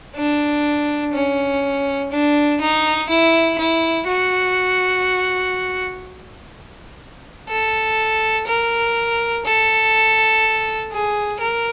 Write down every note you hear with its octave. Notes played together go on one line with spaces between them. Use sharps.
D4
C#4
D4
D#4
E4
E4
F#4
A4
A#4
A4
G#4
A#4